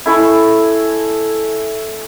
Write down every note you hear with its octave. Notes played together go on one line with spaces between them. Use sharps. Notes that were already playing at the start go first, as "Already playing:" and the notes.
E4 A4 G#5 C#6